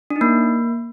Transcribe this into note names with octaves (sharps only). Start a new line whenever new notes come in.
D4
D#4
A#3